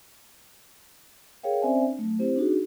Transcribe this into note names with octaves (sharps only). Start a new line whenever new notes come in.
G#4 A#4 C#5 F5 G5
C4 C#4 C5 D5 E5 G#5
D4
F#3 A3
C4 E4 G4 C5
D4 D#4 F#4 G#4